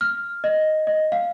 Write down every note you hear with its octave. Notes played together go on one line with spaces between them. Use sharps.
F6
D#5
D#5
F5